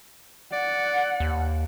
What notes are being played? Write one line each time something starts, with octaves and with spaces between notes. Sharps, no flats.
D5 F#5
D#2